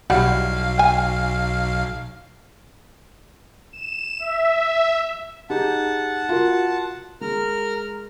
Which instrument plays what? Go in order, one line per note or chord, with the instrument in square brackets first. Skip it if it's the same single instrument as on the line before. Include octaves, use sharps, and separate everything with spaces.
[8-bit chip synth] B1 F5 [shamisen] G3 E4 F#5
[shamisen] G5 G#5
[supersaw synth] E7
E5
[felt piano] D#4 G4 G#4 [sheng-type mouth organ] F#5 A5
[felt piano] F4 F#4 A#4
[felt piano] G#3 [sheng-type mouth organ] A#4 F6